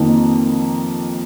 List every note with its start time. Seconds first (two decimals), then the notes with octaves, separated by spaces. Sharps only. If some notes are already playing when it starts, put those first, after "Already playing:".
Already playing: F2 D#3 A#3